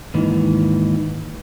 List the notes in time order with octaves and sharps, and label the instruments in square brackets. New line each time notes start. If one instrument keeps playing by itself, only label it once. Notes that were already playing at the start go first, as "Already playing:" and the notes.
[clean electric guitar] D#2 G#2 D#3 E3